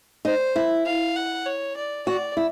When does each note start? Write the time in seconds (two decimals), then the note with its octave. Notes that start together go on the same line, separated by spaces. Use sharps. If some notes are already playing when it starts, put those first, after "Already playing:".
0.25 D#4 C5
0.56 E4
0.86 F5
1.16 F#5
1.45 C#5
1.77 D5
2.07 F#4 D5
2.37 E4